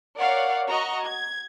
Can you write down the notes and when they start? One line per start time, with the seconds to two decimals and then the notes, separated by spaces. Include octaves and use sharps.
0.19 A#4 C#5 D5 F5 F#5
0.68 F#4 D#5 A#5 C#6
1.04 G#6